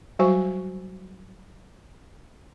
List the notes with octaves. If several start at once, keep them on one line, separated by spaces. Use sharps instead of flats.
F#3 G3 F#4 C5 G#5 C#6